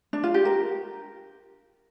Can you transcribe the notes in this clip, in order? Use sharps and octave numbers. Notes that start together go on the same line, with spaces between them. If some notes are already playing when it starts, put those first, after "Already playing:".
D4
F4
G4
A#4